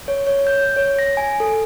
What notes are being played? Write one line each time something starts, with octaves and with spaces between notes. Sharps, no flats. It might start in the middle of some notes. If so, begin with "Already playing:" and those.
C#5
C#5
G6
C#5
A#6
G#5
A4